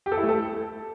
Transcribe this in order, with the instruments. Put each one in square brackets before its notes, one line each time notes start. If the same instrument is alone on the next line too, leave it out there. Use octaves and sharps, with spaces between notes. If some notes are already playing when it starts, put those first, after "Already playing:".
[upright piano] G4
A4
E4
A3
A4